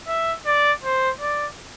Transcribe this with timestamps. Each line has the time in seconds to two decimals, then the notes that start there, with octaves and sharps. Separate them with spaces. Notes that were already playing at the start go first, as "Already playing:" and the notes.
0.08 E5
0.46 D5
0.84 C5
1.21 D5